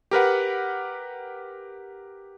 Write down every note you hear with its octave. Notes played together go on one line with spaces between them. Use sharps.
G4 A#4 B4 F#5